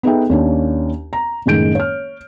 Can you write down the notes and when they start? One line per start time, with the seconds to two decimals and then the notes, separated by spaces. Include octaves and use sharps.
0.03 B3 D#4 G#4 A4 E5 G5
0.29 D#2 C#4 D4
1.13 A#5
1.46 F#1 A2 D#3 G#3 G6 D7
1.75 C#5 F6